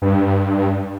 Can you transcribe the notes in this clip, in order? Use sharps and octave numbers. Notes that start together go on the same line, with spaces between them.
G2